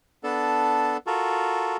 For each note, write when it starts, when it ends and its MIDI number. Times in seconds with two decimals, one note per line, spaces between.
0.24 0.97 59
0.24 0.97 62
0.24 0.97 69
1.07 1.77 65
1.07 1.77 66
1.07 1.77 69
1.07 1.77 70